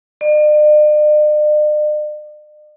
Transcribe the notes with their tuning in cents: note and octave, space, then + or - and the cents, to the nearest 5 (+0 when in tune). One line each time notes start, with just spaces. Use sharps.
D5 +45